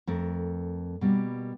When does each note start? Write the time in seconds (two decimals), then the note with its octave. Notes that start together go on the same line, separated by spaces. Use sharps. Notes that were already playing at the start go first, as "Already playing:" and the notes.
0.07 F2 A3 A#4
1.01 B2 G3 A#3